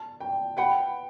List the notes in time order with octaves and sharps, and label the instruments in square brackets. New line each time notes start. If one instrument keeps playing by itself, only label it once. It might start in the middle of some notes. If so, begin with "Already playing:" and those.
Already playing: [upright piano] A5
G5
[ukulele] B4 F#5 B5 [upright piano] G5